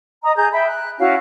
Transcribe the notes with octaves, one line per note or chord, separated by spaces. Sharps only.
D#5 A#5 D#6
G#4 A#5 G6
E5 G5 B5
F#6
C#4 E4 F#4 F5